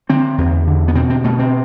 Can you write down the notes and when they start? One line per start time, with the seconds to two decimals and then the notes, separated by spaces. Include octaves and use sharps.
0.09 D3 C4
0.38 E2
0.67 D3
0.88 B3
0.95 B2 C4
1.10 C4
1.24 B2 A3
1.39 C4